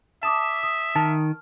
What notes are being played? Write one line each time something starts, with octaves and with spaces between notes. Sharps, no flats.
E5 A5 D6 D#6 E7
D#6
D#3 A5 F6